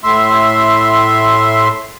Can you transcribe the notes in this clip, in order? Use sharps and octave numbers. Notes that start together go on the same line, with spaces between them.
A2 E5 C6